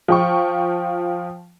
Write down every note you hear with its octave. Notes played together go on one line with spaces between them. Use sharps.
F3 G5 C#6